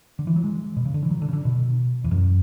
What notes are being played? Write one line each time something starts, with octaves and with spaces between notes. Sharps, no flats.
D3
E3
F#3
G#3
B2
C#3
D3
E3
F#3
D3
C#3
D3
B2
E2
F#2